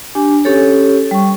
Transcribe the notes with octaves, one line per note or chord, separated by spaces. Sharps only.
D4 G4 G#5
C#4 G4 A4 C#5
G3 C#6